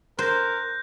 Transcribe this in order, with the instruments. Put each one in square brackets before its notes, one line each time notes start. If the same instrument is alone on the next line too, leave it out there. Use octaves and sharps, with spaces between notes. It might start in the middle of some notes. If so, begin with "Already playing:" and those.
[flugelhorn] A#4 [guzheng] C5 [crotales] F#6 G6 A#6